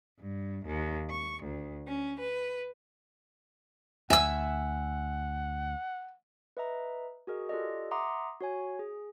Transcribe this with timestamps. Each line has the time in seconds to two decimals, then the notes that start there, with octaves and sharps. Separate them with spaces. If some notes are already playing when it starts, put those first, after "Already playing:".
0.19 G2
0.64 D#2
1.09 C#6
1.42 D2
1.87 C#4
2.20 B4
4.10 D2 E5 F#5 G#5 E6
6.57 B4 D#5 E5 A#5
7.27 F#4 G#4 A#4 D#5
7.49 F4 G4 A4 D5 D#5
7.91 E5 F#5 A#5 C6 D6 D#6
8.40 F#4 C#5 G#5
8.79 G#4